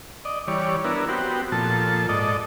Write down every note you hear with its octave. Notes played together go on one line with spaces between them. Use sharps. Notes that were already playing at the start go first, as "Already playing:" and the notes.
D5 D#5
E3 G3 C#5 D5
B3 D4 E4 A#4
B3 C4 F#4 G4
A#2 F3 A4 A5
G#2 A4 D5 D#5